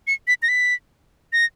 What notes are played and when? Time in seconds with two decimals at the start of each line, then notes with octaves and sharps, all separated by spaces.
0.07 C#7
0.28 B6
0.43 A#6
0.49 B6
1.33 A#6